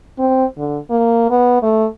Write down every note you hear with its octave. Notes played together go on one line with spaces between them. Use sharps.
C4
D3
A#3
B3
A3